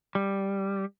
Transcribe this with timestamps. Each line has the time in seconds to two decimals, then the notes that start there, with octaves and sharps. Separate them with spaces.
0.15 G3